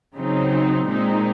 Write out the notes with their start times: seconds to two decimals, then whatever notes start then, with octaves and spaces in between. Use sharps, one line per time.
0.15 C#3 F#3 C4 D#4
0.86 A#2 G#3 C4 D#4